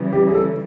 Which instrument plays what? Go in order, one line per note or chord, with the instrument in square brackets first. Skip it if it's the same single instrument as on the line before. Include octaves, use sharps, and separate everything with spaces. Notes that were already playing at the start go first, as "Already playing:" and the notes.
Already playing: [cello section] C#3 E3 G3
[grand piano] G4
G#4
A4